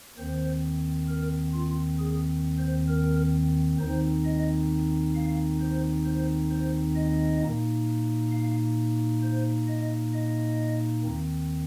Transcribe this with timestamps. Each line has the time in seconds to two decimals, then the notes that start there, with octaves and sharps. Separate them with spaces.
0.17 D#2 D#3 C4 C5
1.08 A#4
1.53 F4
1.99 G#4
2.58 C5
2.88 A#4
3.79 D#2 D#3 C4 D#4 C5
4.25 D#5
5.15 F5
5.61 C5
6.05 C5
6.50 C5
6.95 D#5
7.41 A#2 A#3 D#4
8.31 F5
9.22 C5
9.67 D#5
10.14 D#5
11.03 D#2 D#3 C4